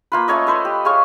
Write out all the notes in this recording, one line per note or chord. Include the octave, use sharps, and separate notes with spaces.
A#3 F4 B4
A3 C#4 C#5 D#5
A4 B4 C5
G4
G#4 C#5 F5 C#6